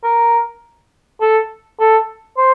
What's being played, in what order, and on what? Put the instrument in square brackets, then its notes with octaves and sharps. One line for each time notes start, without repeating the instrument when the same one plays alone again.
[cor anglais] A#4
A4
A4
C5